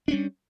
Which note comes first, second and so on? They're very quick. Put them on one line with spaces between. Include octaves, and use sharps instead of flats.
D4 C#4 G3